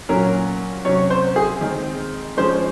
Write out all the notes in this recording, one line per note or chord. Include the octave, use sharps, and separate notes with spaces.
A#2 F#3 C#4 A#4
C3 F#3 C#4 C#5
C5
G#4
D#3 G#3 C4
F3 G#3 C#4 C5